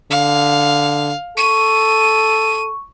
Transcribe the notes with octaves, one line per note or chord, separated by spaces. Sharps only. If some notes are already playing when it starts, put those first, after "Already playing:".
D3 F5
A4 C#6 D#7